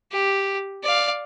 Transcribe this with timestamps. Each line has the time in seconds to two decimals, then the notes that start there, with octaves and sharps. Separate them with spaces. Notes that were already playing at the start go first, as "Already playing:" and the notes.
0.12 G4
0.84 D5 F5